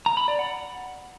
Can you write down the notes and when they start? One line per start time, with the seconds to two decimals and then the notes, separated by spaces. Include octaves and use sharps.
0.06 A#5
0.17 B5
0.28 D5
0.39 F#5